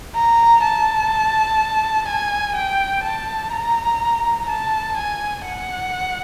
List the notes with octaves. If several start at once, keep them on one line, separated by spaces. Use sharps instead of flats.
A#5
A5
G#5
G5
A5
A#5
A5
G#5
F#5